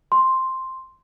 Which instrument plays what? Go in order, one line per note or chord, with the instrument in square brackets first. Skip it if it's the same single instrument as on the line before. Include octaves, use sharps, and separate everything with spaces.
[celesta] C6